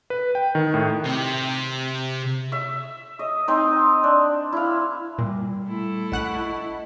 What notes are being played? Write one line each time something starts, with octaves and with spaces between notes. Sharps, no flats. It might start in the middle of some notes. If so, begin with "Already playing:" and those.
B4
G5
D#3
A2
C3
E5
D#5
C4 D#4
D4
E4 F5
A#2 G3
A3 E4
A#1 D#5 F#5 C#6 F#6